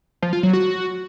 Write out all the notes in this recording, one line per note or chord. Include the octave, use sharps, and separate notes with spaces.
F3
F4
F#3
F#4